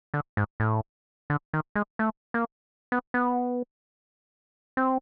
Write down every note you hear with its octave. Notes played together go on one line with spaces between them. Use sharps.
D3
G#2
A2
D3
D#3
G#3
A3
A#3
B3
B3
C4